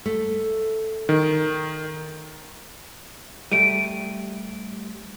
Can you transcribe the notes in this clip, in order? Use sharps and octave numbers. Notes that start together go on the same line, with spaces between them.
A3
D#3
G3 A3 D7 D#7